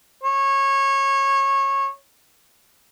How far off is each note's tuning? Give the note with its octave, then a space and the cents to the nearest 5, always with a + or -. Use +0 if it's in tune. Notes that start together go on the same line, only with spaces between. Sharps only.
C#5 -20